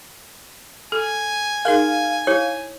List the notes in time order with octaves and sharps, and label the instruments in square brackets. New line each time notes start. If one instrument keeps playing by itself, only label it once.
[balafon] A4 [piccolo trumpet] G#5
[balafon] D#4 G#4 A#4 [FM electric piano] F5
[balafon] E4 [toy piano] C#5